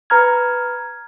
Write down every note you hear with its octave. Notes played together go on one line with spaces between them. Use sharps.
B4 A#5 F6 G#6